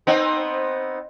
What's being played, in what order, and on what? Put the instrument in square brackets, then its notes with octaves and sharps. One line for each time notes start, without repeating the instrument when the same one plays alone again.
[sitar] B3 C4 D#4